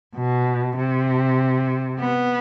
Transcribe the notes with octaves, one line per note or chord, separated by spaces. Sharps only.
B2
C3
B3